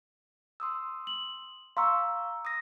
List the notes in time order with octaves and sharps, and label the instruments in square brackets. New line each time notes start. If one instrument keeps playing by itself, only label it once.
[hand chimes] C6 D#6 E6
[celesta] F#7
[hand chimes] F5 A#5 C#6 [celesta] C6 E6
[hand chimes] D#6 A#6